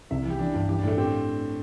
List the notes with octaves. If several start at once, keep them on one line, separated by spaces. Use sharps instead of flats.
C2 E5
E3
G4
E3 D4
G2
E3 G4
D4
A2 A3
C4 G4